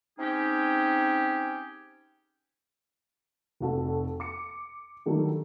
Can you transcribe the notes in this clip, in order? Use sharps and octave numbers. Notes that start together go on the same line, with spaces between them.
C4 C#4 D#4 G4 G#4
F1 F2 F#4 A4
D6 C#7
D3 D#3 F#3 G3 A3 A4